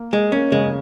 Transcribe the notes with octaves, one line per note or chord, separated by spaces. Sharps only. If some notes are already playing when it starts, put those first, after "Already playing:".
Already playing: A#3
G#3
A#3 C#4
C#3 G#3